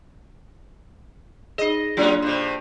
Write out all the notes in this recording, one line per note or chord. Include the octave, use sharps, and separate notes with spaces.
D#4 G#4 D#5
F#3 G#3 A#3 C#4 D4 F4
G2 C3